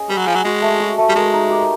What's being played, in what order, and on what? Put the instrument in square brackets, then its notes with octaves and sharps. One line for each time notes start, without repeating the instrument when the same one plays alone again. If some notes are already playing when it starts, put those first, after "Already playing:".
Already playing: [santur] C#4 G#4 D#5
[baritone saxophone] G3 [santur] B4
[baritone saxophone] F#3
[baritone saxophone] F3 [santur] G#4
[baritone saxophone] F#3
[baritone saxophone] G#3 [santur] F#4
[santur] A3
F#4
A3
[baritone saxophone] G3
[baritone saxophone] G#3 [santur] A#4
[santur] D#4
G4